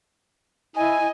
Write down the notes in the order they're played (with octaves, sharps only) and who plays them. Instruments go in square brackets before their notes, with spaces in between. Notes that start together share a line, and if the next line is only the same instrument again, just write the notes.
[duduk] E4 [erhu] D#5 [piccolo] G#5